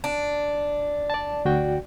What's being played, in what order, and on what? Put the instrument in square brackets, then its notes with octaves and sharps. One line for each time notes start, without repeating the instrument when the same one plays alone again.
[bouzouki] D4
[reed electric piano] D5 A5
D2 F#4 G5